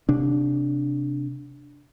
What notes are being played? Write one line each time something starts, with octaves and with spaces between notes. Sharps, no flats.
C3 D4